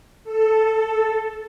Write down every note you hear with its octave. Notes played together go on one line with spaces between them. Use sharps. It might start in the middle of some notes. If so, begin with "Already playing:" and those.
A4